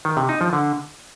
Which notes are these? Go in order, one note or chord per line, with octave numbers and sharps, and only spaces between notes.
D#3
C3
D#4
F3
D3